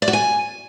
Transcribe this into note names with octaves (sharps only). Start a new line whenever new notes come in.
D5
F#4
G#5